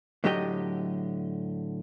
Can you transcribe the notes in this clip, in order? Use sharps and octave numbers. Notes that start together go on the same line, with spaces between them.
A2 D3 F#3 G4 D#5 G5